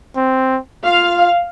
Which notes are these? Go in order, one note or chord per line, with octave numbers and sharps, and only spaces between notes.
C4
F4 F5